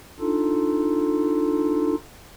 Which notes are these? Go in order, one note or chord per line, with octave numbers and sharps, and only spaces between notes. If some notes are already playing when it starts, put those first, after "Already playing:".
D4 D#4 F4 A4